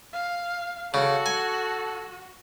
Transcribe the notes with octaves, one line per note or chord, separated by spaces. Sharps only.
F5
C#3 F#4 A4
G#5